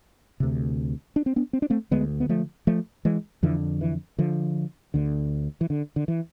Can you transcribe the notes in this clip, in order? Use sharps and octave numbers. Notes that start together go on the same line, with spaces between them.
D2 C3
D4
C4
B3 D4
C4
D4
A3 C4
D2 D3 G#3 B3
B3
F3 A3
F3 A3
E3 G#3
F2 D3 E3
E3
D3 F3
D2 D3
E3
D3
D3
E3